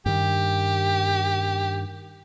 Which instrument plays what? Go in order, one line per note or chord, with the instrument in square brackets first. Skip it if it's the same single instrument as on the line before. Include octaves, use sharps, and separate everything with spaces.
[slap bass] G2 D#3 [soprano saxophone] G4